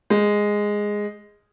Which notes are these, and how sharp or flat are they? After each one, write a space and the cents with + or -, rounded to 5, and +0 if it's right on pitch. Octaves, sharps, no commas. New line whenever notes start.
G#3 -5